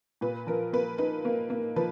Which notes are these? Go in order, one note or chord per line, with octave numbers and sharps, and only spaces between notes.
A#2 B4
F3 A#4
A#3 B4
D#4 B4
A#3
A#3
F3 B4